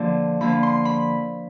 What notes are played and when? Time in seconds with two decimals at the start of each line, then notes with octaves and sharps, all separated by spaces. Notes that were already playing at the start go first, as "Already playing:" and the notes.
Already playing: D3 F3 A#3 D4
0.41 D3 F3 A#3 D4 B5
0.63 C6
0.85 B5